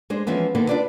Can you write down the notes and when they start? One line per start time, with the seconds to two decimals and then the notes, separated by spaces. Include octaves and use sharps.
0.10 G#3 D4 C5
0.27 E3 F3 G#3 B3 C#4
0.55 D3 D#3 A#3 B3
0.69 D4 F4 B4 D5